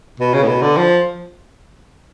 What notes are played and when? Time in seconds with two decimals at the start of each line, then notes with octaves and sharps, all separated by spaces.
0.20 B2
0.34 C#3
0.43 A2
0.48 B2
0.62 D3
0.77 F3